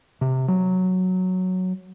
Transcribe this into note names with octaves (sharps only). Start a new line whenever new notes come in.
C3
F#3